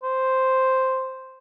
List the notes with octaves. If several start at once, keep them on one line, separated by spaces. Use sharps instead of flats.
C5